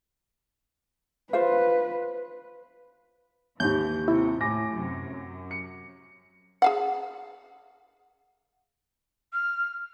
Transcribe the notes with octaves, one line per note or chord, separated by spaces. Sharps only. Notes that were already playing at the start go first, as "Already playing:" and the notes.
F4 B4 C5 F5
D#2 G#2 E3 G6
C3 E4
A2 G#5 D6 A#6
F#2 C3
F#2
C#7
G#4 F5 F#5
F6